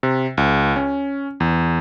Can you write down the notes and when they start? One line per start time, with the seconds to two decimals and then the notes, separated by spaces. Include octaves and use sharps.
0.03 C3
0.37 C#2
0.76 C#4
1.40 E2